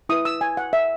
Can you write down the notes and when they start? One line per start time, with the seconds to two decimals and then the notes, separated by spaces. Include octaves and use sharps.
0.09 E4 B4 D#6
0.25 E6
0.41 G#5
0.57 F#5
0.73 E5